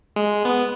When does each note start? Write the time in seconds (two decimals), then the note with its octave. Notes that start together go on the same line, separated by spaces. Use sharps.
0.16 G#3
0.45 B3